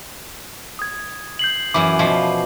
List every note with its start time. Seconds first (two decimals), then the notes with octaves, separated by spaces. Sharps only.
0.79 D#6 G#6
1.39 G6 C7 F#7
1.74 F#2 E3 D6
1.99 B2 F3